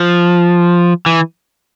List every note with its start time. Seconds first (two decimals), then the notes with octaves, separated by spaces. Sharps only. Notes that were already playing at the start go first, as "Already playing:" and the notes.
Already playing: F3
1.06 E3